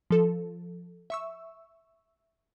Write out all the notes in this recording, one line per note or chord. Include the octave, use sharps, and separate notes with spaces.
F3 A4
E5 C#6 E6